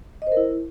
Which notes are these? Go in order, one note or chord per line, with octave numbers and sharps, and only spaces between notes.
D#5
C5
A#4
E4